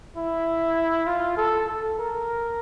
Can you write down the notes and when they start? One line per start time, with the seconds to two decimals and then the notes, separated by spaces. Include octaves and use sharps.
0.17 E4
1.07 F4
1.37 A4
1.68 A4
1.99 A#4